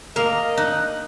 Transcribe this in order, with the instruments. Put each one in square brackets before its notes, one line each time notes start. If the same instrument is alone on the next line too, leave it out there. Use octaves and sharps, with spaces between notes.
[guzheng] A#3 [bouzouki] A#4 [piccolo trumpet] D#5
[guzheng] D#4 [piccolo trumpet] F#6